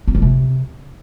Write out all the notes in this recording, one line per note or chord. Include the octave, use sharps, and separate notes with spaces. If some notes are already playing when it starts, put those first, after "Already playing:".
C4
D#3
C3